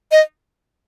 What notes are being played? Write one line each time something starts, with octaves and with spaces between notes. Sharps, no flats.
D#5